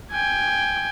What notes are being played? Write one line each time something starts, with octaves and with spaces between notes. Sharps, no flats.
G5 G#5